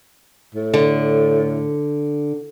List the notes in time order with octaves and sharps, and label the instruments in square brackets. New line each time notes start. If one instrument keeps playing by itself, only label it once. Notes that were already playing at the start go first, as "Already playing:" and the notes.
[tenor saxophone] A2
[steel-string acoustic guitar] D3